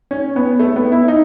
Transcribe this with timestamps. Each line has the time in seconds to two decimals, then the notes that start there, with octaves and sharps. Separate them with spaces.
0.11 C#4
0.36 B3
0.59 A3
0.76 B3
0.92 E4
1.08 D#4